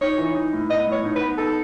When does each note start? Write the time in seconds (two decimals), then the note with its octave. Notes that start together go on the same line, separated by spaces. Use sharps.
0.01 D#4 C#5
0.18 E3
0.35 D#4
0.53 A2
0.69 B3 D#5
0.87 A2 C#5
1.04 D#4
1.16 B4
1.21 B3
1.38 D#4 A4